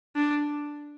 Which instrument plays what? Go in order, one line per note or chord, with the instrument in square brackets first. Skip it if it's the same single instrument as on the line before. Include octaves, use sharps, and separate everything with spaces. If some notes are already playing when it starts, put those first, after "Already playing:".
[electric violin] D4